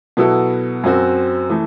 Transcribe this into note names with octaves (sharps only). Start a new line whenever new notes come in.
B2 F#3 B3 E4 A4
F#2 F#3 C4 F#4
E3 A3